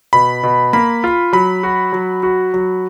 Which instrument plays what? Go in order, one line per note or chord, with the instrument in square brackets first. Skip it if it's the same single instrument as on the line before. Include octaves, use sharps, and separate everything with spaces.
[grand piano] B2 [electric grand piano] B5
[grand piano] B2
[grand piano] A#3 [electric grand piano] B5
[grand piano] F4
[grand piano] F#3 [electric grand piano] B5
[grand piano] F#4
F#3
F#4
F#3